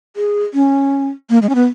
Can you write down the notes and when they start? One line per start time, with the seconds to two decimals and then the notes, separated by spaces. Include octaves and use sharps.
0.16 G#4
0.54 C#4
1.30 A#3
1.42 G#3
1.49 C#4
1.55 B3